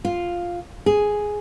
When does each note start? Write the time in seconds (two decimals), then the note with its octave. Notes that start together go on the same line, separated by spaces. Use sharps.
0.05 F4
0.86 G#4